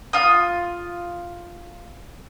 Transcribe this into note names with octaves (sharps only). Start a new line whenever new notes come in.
F4 D#6